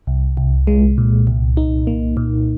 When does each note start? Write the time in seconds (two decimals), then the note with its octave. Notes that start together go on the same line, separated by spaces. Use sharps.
0.07 C2
0.37 C2
0.67 G#3
0.98 A#2
1.27 C2
1.57 D#4
1.87 A#3
2.17 A#2